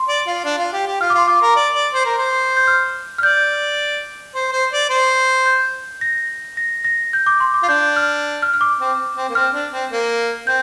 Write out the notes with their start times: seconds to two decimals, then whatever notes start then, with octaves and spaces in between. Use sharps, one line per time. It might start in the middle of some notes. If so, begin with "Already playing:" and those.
Already playing: C6
0.08 D5
0.27 F4
0.44 D4
0.59 F4
0.73 G4
0.87 G4
1.00 F4 F6
1.10 D6
1.14 F4 C6
1.28 F4 D6
1.42 A#4
1.56 D5
1.74 D5
1.93 C5
2.05 A#4
2.18 C5
2.57 G6
2.67 F6
3.18 F6
3.23 D5 G6
4.35 C5
4.52 C5
4.72 D5
4.90 C5
5.46 G6
6.01 A#6
6.57 A#6
6.84 A#6
7.13 G6
7.26 D6
7.40 C6
7.54 D6
7.63 F4
7.69 D4 G6
7.96 F6
8.42 F6
8.54 F6
8.61 D6
8.80 C4
9.17 C4
9.29 A#3
9.35 C4 F6
9.54 D4
9.72 C4
9.91 A#3
10.47 C4 G6